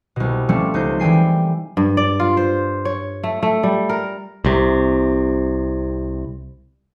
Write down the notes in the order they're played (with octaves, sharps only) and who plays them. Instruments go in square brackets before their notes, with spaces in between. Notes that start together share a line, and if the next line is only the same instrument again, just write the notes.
[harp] C2 B2
F3 G3 A3 C4 C#4
C#2 D#4 C5 G6
E3 G3 G5 G#5 C7
[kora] G2
D5
F4
C5
C#5
A3
A3
G3
A#4
[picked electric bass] C2 C3